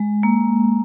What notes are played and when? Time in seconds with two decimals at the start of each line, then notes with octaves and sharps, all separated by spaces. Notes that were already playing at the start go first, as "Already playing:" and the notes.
Already playing: G#3
0.23 A#3